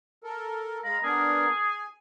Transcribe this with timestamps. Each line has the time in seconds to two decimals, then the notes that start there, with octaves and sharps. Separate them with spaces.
0.24 A4 A#4
0.84 G#3 F5 A#5 B5
1.03 B3 D4 G#4 A#4
1.63 G#5